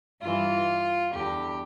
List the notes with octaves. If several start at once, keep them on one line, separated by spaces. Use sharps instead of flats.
G2 E3 F4
E2 D3 G4